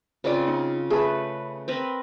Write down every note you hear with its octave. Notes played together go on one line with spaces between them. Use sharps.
C#3 C4 F4 B4 D5
D#4
A3 G#4 B4 E5 A5
C4 A#4 B4